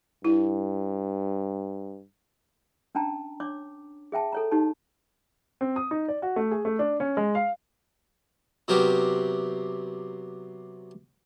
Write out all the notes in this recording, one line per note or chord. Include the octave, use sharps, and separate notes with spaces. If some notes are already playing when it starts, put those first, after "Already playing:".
G2 E4
C#4 D4 G5 A5 A#5
D4 C#5 D6
G#4 E5 G5 A5
A4 C#5 A#5
D#4 G4 C#5 A5
C4
D#6
D#4
D5
F#4
A3
G#4
A3
D4
C#4
G#3
F5
C3 F#3 B3 G4 A#4